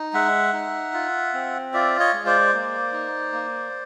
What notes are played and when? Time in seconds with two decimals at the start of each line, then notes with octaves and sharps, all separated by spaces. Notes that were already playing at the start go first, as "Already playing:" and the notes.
Already playing: D#4
0.13 G#3 E5 F#5
0.53 D#4
0.93 F4
1.34 C4
1.73 F4 D5 E5
1.99 C#5 D#5
2.14 G#3
2.26 C5 D5
2.53 A#3
2.92 D#4
3.33 A#3